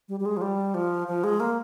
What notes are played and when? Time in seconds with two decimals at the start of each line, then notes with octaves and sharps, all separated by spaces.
0.09 G3
0.20 G3
0.26 G#3
0.37 F3
0.42 G3
0.75 F3
1.08 F3
1.24 G#3
1.40 A#3